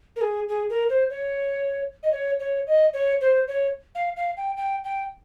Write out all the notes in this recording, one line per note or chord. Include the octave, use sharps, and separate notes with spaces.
A#4
G#4
G#4
A#4
C5
C#5
D#5
C#5
C#5
D#5
C#5
C5
C#5
F5
F5
G5
G5
G5